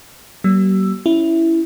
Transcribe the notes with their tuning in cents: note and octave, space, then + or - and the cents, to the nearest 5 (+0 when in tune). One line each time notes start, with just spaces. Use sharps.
G3 -45 A#3 +30 E6 +10
C#4 +0 E4 +0